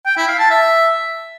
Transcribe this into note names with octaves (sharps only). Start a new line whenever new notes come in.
G5
E4
F5
A5
E5